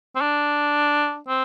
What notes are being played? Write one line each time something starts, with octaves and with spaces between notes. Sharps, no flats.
C4
D4
C4